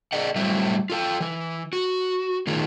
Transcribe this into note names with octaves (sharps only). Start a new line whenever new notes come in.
G#4 D5 D#5 F#5
A2 F#3 G3 A3 C4 E4
F4 A4 G5
E3 E4
F#4
A2 D#3 D#4 F4 G#4